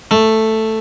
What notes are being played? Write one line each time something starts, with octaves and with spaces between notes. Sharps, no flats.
A3